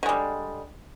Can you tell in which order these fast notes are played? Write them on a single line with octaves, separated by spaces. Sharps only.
D3 G#3 G3